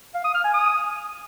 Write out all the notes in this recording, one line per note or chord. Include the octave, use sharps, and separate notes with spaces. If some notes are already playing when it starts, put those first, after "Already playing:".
F5
D#6
F6
G#5
D#6